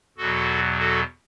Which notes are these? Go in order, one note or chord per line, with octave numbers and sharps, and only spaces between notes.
E2 B2 F#3 F#4 A4
F#4 A4